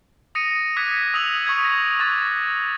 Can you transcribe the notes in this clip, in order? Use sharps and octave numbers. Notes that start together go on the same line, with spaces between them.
D#6 A#6 C#7 D#7
D6 D#6 F#6 G#6 B6 C#7
D#6 E6 A#6 D#7 F7 F#7
C#6 D#6 G#6 B6
A#6
C#6 D6 F#6 A6